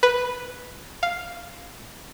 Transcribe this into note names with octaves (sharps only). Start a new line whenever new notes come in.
B4
F5